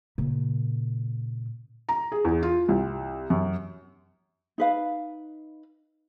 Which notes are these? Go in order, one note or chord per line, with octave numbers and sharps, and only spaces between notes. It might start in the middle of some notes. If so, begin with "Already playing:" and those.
A#2 C#3
A#5
G#4
E2
F4
C2
F#2
D#4 B4 F5